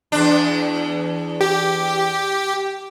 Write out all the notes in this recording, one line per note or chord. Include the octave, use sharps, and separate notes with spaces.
E2 D4
G4